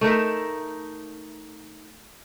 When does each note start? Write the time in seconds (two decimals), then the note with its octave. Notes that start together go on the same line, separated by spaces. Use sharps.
0.01 A3 D#4 A#4 E5